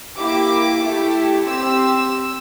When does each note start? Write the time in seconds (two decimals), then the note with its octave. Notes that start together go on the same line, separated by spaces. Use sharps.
0.18 A#3 E4 G4 D6
0.83 A3 E4 G4
1.46 C4 G4 E6